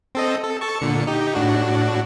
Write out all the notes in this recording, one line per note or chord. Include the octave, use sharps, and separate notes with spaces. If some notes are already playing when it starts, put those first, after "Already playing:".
C4 A4 D#5
A4
A4 A5 C#6
A#2 D3 C#7
D#4 G4
A2 D4 F#4